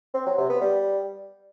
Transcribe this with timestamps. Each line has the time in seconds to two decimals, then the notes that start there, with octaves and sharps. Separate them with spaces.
0.14 C4
0.26 F#3
0.38 C3
0.49 B3
0.61 G3